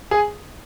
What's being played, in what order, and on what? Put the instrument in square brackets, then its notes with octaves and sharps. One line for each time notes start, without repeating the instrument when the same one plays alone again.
[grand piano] G#4